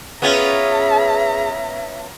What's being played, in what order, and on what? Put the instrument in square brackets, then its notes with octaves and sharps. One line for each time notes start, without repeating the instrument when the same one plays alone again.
[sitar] B3 C#4 F4 [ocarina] G#4 [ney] E5 [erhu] A#5